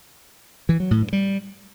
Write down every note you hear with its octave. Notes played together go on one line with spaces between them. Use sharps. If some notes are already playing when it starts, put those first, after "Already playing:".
E3
F#3
A2
G2
G3